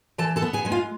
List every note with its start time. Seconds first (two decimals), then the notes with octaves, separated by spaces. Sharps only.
0.18 E3 A4 A5
0.36 A4 A5
0.42 B3
0.53 G#4 G#5
0.65 G#3 G#5
0.72 F4 F5